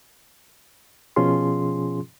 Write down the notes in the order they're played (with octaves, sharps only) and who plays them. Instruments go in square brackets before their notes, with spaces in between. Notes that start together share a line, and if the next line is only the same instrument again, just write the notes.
[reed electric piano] B2 F3 C#4 F4 G#4 C6